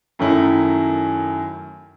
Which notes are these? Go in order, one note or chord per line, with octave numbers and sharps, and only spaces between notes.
F#2 D#3 A3 C#4 D#4 E4